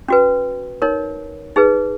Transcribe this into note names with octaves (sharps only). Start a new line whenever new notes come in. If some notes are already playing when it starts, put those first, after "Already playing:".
C#4 F#4 B4
D#4 A#4 C#5
D#4 G#4 B4